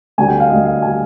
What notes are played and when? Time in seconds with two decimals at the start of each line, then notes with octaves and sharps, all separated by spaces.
0.18 D2 D3 G3 G#5
0.28 G5
0.40 F5
0.50 D2 D3 G3 D#5
0.66 F5
0.82 D3 G3 G#5